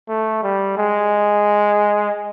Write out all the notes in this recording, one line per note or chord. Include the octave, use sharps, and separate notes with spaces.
A3
G3
G#3